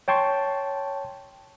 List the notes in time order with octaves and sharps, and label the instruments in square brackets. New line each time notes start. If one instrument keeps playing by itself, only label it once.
[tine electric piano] C#5 G5 A5 C6 C#6